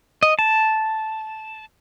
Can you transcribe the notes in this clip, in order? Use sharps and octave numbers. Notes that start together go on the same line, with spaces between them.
D#5
A5